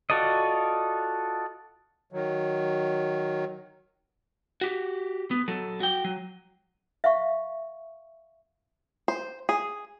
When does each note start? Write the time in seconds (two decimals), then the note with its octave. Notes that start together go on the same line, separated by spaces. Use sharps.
0.10 F4 F#4 A4 D5 D#5
2.13 D#3 F#3
4.61 F#4 G4
5.31 B3
5.48 F#3 A4
5.80 F#4 G5
6.05 F#3
7.04 E5 F5 C#6
9.08 C5
9.49 G#4